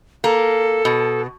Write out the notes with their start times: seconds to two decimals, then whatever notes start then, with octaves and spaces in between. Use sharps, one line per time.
0.24 A#3 A4
0.85 B2